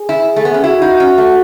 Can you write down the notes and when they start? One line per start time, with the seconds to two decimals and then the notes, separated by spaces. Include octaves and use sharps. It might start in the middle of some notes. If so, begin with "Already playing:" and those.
Already playing: G#4
0.09 E4
0.36 A3
0.45 B3
0.54 C#4
0.64 E4 F#4
0.82 D#4
1.00 C#4
1.18 A3